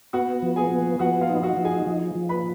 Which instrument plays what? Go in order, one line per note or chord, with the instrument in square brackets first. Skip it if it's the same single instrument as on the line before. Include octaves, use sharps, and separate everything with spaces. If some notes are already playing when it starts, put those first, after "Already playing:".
[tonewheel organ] B3 [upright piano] F#4 F#5
[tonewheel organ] F3
[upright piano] G#4 G#5
[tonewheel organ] B3
[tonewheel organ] F3 [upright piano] F#4 F#5
[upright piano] F4 F5
[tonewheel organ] D#4
[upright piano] F#4 F#5
[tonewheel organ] F3
[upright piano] G#4 G#5
[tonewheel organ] F3
F3
[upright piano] B4 B5